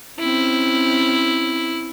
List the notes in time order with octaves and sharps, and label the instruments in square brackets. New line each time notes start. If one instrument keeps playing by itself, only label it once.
[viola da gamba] C4 C#4 [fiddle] E4